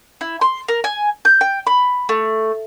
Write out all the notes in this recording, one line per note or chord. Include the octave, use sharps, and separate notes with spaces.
E4
C6
A#4
G#5
G6
G5
B5
A3